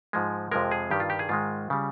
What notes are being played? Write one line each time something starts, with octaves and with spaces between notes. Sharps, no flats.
G#2 F3 G#3
F2 C3 F3 G#3 A#4
G#4
G2 D#3 G3 G4
F4
G4
G#4
G#2 D#3 G#3 F4
C#3 G3